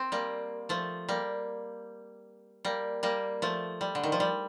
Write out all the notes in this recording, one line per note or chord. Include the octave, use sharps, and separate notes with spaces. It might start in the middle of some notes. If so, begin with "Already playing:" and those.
Already playing: C4
G3 A#3
F3 A3
G3 A#3
G3 A#3
G3 A#3
F3 A3
G3
D3
D#3
F3
G3